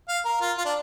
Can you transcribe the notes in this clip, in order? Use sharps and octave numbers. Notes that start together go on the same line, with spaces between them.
F5
A#4
F4
F4
D4